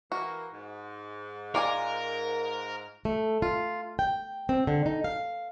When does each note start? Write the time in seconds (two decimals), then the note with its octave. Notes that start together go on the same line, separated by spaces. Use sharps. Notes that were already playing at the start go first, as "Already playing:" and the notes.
0.12 E3 A#3 F#4
0.52 G#2
1.55 F4 A#4 D5 G#5
3.05 A3
3.42 F4
3.99 G5
4.49 C4
4.67 D3
4.86 D#4
5.04 F5